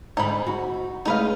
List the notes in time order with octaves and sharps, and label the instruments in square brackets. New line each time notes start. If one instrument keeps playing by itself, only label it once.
[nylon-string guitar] G#2 D3 [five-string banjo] D#4 B5
[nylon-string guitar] F#4
[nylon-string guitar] C#3 G#3 A3 [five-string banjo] D#4 B4 F5